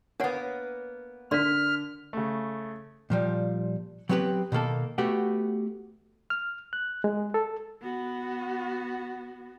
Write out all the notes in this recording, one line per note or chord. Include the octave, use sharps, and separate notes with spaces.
A#3 B3 D4 C#5 F#5
D3 A#4 D5 C6 F6 B6
C#3 A3
A#2 F3 G3
F#3 B3 C4 G4 B4
B2 D#3 A#3 A4
A3 B3 F#4 G4
F6
F#6
G#3
A4
B3 F#4